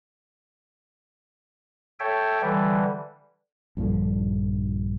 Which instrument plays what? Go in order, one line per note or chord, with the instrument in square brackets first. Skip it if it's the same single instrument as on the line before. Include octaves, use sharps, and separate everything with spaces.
[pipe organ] A4 C#5 E5 G5
D3 E3 G3
[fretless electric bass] A#1 G2 D3 F3